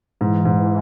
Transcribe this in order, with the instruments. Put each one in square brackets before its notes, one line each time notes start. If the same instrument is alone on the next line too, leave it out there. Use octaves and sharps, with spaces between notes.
[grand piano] G#2 [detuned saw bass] E3
[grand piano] G#2